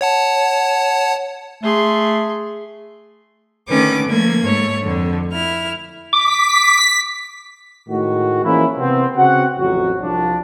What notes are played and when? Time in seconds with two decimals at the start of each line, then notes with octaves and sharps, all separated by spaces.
0.01 C#5 F#5 A5
1.63 A3 G#4 C6
3.69 D3 D#3 A3 C#4 B4 D6
4.08 F3 A3 A#3 G#6
4.43 G#2 A3 C#5
4.83 F2 D3
5.33 E4 F6
6.13 D6 B6
7.89 A2 D#3 G#3 F#4
8.45 E3 F3 G#3 A#3 C#4 E4
8.78 C3 B3 C4
9.16 C#3 C4 F#4 F#5
9.58 A1 F2 F#3 F#4
10.01 C2 F3 D4